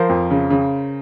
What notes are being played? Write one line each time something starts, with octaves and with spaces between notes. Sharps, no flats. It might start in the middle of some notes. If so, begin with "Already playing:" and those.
Already playing: F3 A#4 C5
F2
C#3
C#3